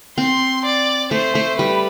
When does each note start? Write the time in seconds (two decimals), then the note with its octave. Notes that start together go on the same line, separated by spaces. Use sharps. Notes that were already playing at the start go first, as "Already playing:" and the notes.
0.18 C4 C6
0.65 D5
1.11 A3 C5
1.35 A3
1.58 G3 B4